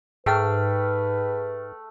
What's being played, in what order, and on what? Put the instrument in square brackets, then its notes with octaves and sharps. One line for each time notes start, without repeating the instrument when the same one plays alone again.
[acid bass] G#2 [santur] A3 [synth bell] G#4 G5 F6 [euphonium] B4